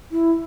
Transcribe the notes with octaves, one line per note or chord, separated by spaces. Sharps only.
E4